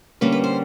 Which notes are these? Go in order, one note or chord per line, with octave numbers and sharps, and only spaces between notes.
D3 G3 A#3 C#4 B4
B4
C5